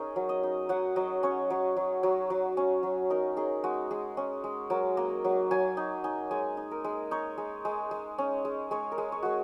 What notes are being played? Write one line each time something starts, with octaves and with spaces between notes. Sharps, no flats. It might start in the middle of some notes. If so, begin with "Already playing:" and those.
Already playing: C#4 D#4 G#4 A#4
F#3
D#5
D#4
F#3 F#5
F#3 D#5
C#4 C#5
F#3
F#3
F#3
F#3
C#4
F#3
D#4 A#4
D#4 G#4
G#3 F#4
G#3 G#4
C#4
G#3
F#3 A#4
A#3 D#5
F#3
F#3 G#5
D#4 G#5
D#4 G#5
G#3 G#5
D#4
A#4
G#3
D#4 C#5
G#3
G#3
G#3
C#4
G#3
G#3 C#5
A#4
G#3
C#5
G#3 F#4